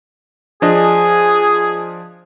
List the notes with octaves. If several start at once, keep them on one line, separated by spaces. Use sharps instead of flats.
F3 D4 G#4 D#5